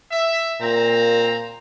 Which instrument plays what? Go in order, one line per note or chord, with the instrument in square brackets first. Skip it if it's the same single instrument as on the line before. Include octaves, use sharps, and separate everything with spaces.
[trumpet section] E5
[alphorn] A#2 [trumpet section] C4 A#5